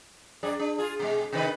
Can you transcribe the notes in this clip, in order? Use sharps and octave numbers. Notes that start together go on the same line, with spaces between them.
F#2 G#4 D5
D4
F4 G#4
B2 G#3
C3 D#3 B4